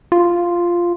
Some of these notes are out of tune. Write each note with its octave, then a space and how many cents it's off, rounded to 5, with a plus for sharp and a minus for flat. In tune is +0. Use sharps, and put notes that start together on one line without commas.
F4 -5